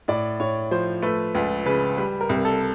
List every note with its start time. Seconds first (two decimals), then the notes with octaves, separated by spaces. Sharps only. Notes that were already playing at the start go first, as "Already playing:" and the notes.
0.08 A2 D5
0.40 A2 C#5
0.71 F3 C5
1.02 A3 B4
1.35 C#2 B4
1.66 C#3 B4
1.97 G3 B4
2.21 A#4
2.29 C2
2.45 A4